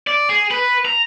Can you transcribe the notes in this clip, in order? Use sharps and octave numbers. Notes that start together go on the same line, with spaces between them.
D5
G#4
B4
A#5